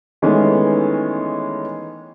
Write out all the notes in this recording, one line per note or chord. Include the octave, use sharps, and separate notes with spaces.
D#3 E3 G#3 A3 B3 C#4